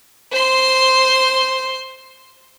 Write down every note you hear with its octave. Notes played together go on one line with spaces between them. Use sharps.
C5 C6